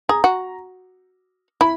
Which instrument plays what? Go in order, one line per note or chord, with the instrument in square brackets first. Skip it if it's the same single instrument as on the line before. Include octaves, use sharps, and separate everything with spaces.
[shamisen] G#4 [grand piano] A#5
[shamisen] F#4
[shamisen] E4 [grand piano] B5